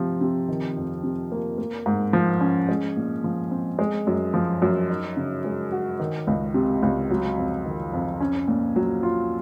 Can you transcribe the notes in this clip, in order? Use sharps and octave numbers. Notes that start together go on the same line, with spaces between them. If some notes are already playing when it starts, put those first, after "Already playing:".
Already playing: C3 F3
C3
D#3
F2
C3
A#3
A#3
G#2
F3
C#4
G#3
A#2
F3
C4
G#3
F#2
F3
F#2
D#4
C#3
G#3
F#4
D#3
C#2
C3
C#2
F#3
F2
D#3
F2
C#4
A#2
F#3
F4